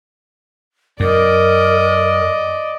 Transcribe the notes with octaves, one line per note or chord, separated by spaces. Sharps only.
F#2 A#4 D5 D#5